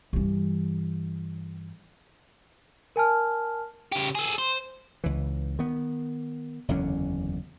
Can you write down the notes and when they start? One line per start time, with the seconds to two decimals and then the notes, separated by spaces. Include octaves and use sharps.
0.13 G2 E3
2.96 A#4 G#5 A5 F6
3.92 C#3 G4
4.15 G#4 A4
4.38 C5
5.04 C#2 E3
5.59 D#3 B3
6.68 F#1 E2 D3 C#4